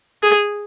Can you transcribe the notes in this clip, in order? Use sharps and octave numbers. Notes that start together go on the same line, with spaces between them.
G#4